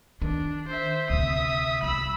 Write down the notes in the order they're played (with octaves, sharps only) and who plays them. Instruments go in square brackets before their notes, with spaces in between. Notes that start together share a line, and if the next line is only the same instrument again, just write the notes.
[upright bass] D#3 [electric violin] D4
[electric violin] C5 E5
[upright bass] D2 C3 [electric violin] E5 D#6
[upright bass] C2 [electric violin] B5 E6